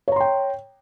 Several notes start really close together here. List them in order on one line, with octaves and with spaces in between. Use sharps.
C#5 A#5 C6 G5